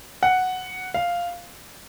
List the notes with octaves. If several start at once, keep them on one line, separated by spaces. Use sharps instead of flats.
F#5
F5